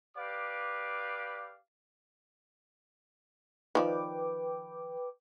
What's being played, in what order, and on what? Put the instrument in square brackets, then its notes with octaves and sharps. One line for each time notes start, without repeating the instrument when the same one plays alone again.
[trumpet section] G4 B4 D5 F5 D6
[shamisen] D#3 F3 D5 [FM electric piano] B4 G5 D6